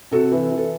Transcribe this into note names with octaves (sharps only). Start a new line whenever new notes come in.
C3 F#4 A4
E3
E3
A4